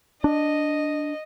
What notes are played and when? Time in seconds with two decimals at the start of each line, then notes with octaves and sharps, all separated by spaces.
0.24 D4 D#5